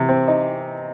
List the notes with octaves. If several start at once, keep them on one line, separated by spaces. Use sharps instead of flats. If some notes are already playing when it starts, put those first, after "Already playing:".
Already playing: C3 E3
C4
D#4